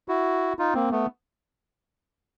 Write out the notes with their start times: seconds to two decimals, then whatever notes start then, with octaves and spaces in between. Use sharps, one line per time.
0.08 E4 F#4
0.59 D#4 F4
0.74 A#3 C4
0.91 A3 B3